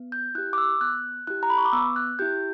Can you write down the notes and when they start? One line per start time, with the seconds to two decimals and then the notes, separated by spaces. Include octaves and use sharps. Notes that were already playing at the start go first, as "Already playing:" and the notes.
Already playing: B3
0.12 G6
0.35 E4 G4 F#6
0.53 D6
0.58 E6
0.81 B3 F#6
1.27 E4 G4 F#6
1.43 A#5
1.50 B5
1.58 C#6
1.65 D6
1.73 B3 E6
1.96 F#6
2.19 E4 G4 G6